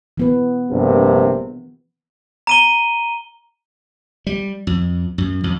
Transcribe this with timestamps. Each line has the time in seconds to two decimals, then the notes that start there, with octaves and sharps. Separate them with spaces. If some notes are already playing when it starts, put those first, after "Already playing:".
0.17 E3 B3 B4
0.71 A#1 G2 C3
2.47 A#5 D#7 G7
4.27 G3
4.67 F2
5.18 F#2
5.44 F2